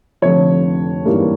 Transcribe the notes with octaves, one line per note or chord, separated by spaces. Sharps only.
F1 F2 D3 F3 C#5
G#1 G2 E3 G3 A#3